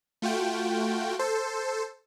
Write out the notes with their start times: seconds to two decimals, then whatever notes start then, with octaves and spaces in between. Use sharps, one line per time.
0.22 A3 F4 F#4 G5
1.19 A4 C5